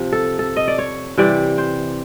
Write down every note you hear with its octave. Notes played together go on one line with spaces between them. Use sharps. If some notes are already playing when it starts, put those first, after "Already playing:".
Already playing: C3 F3
A4
A4
D#5
D5
C#5
C3 E3 G3 D5
C5